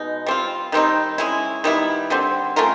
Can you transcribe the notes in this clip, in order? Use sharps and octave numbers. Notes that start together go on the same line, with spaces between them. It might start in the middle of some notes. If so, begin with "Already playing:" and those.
Already playing: B2 G#3 B3 D#4
G3 C4 F4
D#3 G3 C4 D#4
G#3 C#4 E4
D#3 G3 B3 E4
D3 G3 C4
A3 C#4 F4 A#4